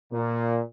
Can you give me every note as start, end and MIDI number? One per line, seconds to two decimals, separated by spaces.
0.11 0.60 46